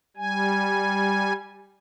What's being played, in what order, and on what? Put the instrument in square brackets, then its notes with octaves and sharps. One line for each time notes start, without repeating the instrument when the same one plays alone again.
[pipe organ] G3 G#5